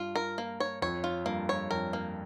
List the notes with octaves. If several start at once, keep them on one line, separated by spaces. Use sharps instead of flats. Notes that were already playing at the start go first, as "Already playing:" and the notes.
Already playing: G2 F4
A#4
A#3
C#5
F2 C#5
F4
G2 A#3
C#5
F2 A#4
A#3